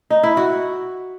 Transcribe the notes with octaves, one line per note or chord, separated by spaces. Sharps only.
D#4
E4
F#4